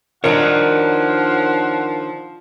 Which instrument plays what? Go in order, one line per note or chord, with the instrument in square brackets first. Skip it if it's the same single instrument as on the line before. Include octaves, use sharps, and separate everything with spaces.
[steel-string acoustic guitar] D#3 D4 [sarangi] F3 [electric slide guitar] A#4 C#5 [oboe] F#5